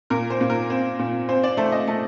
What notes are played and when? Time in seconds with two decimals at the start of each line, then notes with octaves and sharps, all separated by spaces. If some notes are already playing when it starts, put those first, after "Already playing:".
0.10 A#2 A#4
0.30 C5
0.41 A#2
0.50 A#4
0.70 C4
0.99 A#2
1.29 C4 C5
1.44 D5
1.57 A3 C5
1.72 D#5
1.87 A3